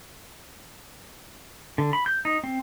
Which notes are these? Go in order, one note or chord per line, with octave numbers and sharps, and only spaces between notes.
D3
B5
G6
D#4
C4